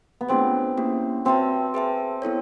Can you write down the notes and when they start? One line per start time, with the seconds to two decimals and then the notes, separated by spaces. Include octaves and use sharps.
0.21 B3
0.29 A3 C4 D4 F4 G#4 C5
0.77 A#3 C#4 E4 G4
1.25 C4 F#4 B4 E5 A5
1.74 G#4 B4 E5 A5
2.22 B3 E4 A4 C#5